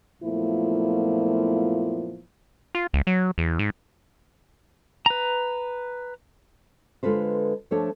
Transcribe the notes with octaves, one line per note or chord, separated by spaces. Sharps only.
F#2 A#2 F3 A3 B3 E4
F4
C#2
F#3
E2
G#2
B4 A#5
D3 G#3 F4 A4 B4 C5
F3 A3 D4 A4 C#5 D5